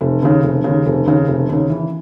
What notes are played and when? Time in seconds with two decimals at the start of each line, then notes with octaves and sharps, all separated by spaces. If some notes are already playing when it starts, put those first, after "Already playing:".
0.01 F1
0.23 D#2 C#3
0.43 F1
0.64 D#2 C#3
0.86 F1
1.06 D#2 C#3
1.28 F1
1.49 D#2 C#3
1.70 E3